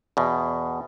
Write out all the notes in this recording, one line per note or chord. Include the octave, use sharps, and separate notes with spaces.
E2 B2